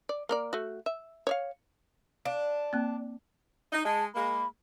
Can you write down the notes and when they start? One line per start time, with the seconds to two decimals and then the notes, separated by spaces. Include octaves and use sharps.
0.09 D5
0.29 A#3 A#4 D5
0.53 A3 F#4
0.86 E5
1.27 C#5 D5 F5
2.25 D4 F5
2.73 A#3 C4
3.72 D#4
3.85 G#3 A5
4.15 G#3 A#3 B5